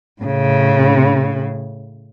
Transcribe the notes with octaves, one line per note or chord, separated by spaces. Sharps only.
A2 C#3